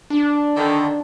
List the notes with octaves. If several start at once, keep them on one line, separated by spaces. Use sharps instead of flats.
D4
D3 D#3